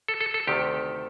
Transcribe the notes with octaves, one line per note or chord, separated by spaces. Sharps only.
A4
A4
A4
D2 C3 D#3 G4